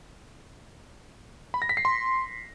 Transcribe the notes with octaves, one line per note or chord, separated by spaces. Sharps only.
B5
A#6
B6
C7
C6